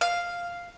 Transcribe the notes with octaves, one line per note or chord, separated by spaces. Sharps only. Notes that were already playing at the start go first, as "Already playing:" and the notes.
F5